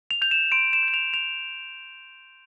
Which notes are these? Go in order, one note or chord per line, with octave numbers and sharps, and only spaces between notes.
F7
G6 F7
E7
C6 D7
E7
G6
E7
F7
C6 F7